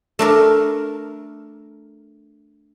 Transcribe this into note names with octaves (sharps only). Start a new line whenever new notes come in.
A3 D4 A#4